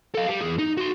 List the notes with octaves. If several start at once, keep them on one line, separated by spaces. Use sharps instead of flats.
A4 F5
G3
E2 G#4
D#4
F#4 C6